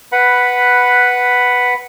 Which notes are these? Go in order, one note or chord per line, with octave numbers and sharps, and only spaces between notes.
B4 F#5 B5